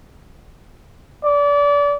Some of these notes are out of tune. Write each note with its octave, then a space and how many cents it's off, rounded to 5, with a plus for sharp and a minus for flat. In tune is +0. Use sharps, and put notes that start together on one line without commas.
D5 -30